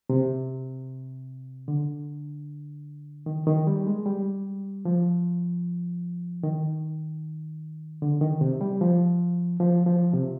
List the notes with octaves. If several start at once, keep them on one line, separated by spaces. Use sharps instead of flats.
C3
D3
D#3
D#3
G3
G#3
G3
F3
D#3
D3
D#3
C3
G3
F3
F3
F3
C3